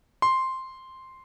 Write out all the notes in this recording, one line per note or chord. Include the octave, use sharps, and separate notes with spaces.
C6